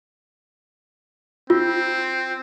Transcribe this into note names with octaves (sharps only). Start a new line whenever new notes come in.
C4 F4